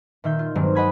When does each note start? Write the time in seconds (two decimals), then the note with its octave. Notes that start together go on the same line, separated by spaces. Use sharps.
0.24 A#2 D#3 E5 G6
0.39 F4
0.55 G2 D#3 F#3 G#3 A#3 C4
0.75 D#5 F#5 G#5 B5 D#6 G#6